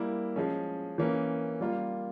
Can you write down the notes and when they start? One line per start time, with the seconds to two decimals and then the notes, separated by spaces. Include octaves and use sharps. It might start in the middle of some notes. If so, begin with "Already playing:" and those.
Already playing: G3 A#3 E4
0.36 F3 G#3 C#4
0.98 E3 A#3 C#4
1.60 G3 A#3 F4